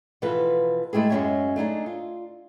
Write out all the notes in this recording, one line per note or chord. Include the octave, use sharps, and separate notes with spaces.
B2 E3 F3 F4 A4 B4
G#3 A3 E4 G4 G#4
F#2 G#3 A#3 C#4 E5 G#5
A3 D4 D#4 G#4
F4